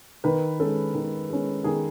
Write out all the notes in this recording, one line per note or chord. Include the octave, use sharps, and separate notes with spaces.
D#3 B4
G#3 C#4 A4
D#3
G#3 C#4
D#3 G#4